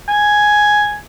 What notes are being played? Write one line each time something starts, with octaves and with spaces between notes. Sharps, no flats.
G#5